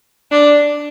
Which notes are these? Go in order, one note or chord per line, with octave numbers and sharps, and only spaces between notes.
D4